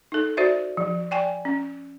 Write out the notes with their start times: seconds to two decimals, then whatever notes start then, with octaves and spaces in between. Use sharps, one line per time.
0.12 D#4 A4
0.37 F#4 C5 D5 E5
0.77 F3
1.11 D5 G5 G#5
1.45 C#4